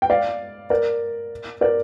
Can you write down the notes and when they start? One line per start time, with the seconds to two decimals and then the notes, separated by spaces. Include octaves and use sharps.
0.02 G5
0.10 D5 F5
0.70 A#4 D5
1.61 A#4 D5